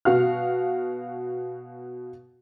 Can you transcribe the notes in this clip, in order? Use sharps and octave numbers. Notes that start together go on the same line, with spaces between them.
B2 F#4 F5 F6